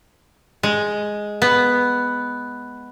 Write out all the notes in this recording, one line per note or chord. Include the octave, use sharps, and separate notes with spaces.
G#3
B3